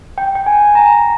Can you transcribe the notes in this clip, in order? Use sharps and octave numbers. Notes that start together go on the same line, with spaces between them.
G5
G5
G#5
A#5